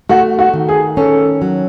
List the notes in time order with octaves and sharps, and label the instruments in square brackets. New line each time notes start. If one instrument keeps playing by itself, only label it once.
[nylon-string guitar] A3 [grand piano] F#4
[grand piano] F#4
[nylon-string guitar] D#3
[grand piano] G#4
[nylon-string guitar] C#4 [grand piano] A4
[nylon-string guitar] F#3